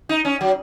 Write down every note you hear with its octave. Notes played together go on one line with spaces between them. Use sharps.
D#4
C#4
F#3